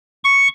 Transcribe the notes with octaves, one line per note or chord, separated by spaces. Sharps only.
C#6